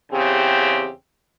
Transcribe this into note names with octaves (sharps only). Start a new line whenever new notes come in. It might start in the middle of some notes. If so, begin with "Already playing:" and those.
E2 C#3 C4 G4